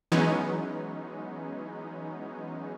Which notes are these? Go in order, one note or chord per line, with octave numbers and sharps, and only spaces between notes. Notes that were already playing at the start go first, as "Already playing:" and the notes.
E3 F#3 G#3 B3 C#4 D#4